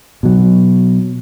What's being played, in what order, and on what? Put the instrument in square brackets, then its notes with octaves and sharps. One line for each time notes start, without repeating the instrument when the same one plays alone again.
[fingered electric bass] B2 F#3